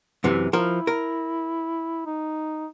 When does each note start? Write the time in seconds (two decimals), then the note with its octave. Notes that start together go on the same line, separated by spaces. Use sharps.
0.24 F#2 C3 E3
0.53 F3 E4 A#4
0.87 A#4
2.06 D#4